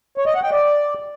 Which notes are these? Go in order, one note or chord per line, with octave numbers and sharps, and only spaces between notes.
C#5
D#5
F#5
G5
D5